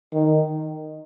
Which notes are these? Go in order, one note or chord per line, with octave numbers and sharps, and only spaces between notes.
D#3